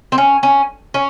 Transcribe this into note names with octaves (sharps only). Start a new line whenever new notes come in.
C4
C#4
C#4
C#4